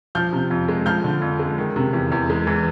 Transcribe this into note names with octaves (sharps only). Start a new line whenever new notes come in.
F3 F6 G6
C3
F2
G#3
F3 F6 G6
D3
F2
G#3
D#3
C3
E2
E2
G#3
E3